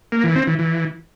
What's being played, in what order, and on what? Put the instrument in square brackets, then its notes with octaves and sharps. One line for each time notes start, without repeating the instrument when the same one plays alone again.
[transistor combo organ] A#3
E3
C4
E3
E3